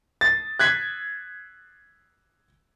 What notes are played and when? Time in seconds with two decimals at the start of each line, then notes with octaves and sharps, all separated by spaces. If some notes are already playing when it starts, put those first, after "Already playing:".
0.21 A6
0.59 F#6 G#6 B6